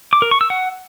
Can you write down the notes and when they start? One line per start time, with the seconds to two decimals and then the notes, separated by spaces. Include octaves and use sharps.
0.13 D6
0.22 A#4
0.31 C#6
0.41 E6
0.50 F#5